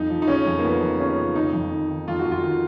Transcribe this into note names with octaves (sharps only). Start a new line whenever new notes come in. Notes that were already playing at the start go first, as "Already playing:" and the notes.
Already playing: F2 D#4
F3
D#4
C#3 C#4
F2
A#3
F2 B3
F3
C#3 C#4
F2
F2 D#4
F2
D#3
D#3
F2 F4
F#4
F2
F4
D#3